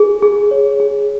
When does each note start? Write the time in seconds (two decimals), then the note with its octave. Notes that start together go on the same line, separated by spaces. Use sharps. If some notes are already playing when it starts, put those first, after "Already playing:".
Already playing: G#4
0.23 G#4
0.51 C#5
0.80 G#4